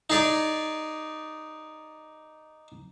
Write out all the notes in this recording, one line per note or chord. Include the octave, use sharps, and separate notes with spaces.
D#4 G#4 D5